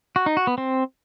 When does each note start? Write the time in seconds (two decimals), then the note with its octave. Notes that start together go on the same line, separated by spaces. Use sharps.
0.16 F#4
0.26 D#4
0.37 F#4
0.47 B3
0.58 C4